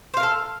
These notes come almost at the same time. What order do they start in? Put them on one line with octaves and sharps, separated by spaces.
C5 F5 A#4 A4